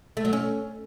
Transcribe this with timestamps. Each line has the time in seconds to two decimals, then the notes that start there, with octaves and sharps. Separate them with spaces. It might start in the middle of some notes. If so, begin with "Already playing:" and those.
0.17 A3
0.25 F#3
0.33 C#4